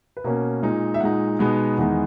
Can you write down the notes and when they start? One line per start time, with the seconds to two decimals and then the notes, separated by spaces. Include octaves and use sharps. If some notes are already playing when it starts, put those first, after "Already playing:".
0.17 B4
0.24 B2 A#3 C#4 A#4
0.62 A#2 G#3 D#4
0.94 E5
1.00 A#2 G#3 D#4 F#5
1.39 B2 G#3 B3 D#4
1.78 E2 D#3 G#3 B3 D#4